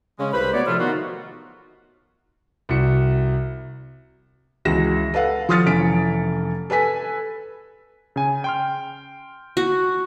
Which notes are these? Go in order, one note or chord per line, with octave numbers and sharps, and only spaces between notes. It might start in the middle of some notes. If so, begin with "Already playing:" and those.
C#3 G#3 C#4
C2 B4 C5 B5
F#3 A3 B3 C#5 D5
A2 C3 F3 A3 F4 F6
D#3 B3 D#4 F4 F#4
C2 F#4 C#7
C#2 E3 F#4 A#6 E7
A4 B4 F5 F#5
F3 C6 D#6 F6 A6 C#7
F1 E3 C#4 B6 D7
A4 B4 G#5 B6
C#3 G#5
G5 C6 F6
F#4